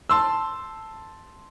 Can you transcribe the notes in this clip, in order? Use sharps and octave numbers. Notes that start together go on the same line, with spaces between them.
A5 C6 E6